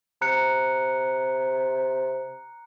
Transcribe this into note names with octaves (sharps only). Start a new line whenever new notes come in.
C3 A#5 F#6 C#7